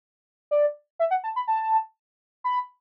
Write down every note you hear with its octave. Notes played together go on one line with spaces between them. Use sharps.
D5
E5
F#5
A5
B5
A5
B5